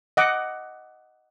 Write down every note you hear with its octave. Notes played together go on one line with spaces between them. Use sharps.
D#5 F#5 D6